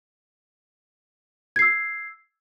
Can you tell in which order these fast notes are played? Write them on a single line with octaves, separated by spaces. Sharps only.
G#6 C7 E6